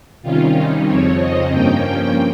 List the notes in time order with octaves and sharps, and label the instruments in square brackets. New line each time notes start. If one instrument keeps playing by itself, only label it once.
[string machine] C3 D#3 G3 C#4 F4
D#4
F2 C#3 F3 C4 C#5
D#5
G2 F3 A#3 C#4 G5